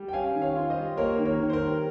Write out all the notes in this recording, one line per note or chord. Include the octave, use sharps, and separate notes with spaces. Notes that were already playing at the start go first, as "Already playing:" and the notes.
Already playing: G3
G5
C#4 F5 G#5
D#3
C#5 F5
F4
C5 D#5
G3
A#3 A#4 C#5
D#3
A#4 C#5
D#3
C5
A#4
G3